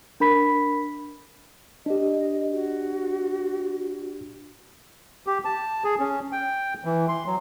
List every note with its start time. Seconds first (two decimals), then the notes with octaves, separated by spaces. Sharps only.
0.20 D4 A#4 B5 B6
1.86 D4 G4 D#5
2.53 F#4
5.27 G4
5.45 A5
5.84 G#4
5.99 C#4
6.32 G5
6.85 E3
7.08 C6
7.26 F#3